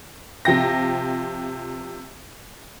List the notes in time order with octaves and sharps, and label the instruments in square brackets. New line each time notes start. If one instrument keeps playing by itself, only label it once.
[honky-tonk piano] C3 F3 G5 A#6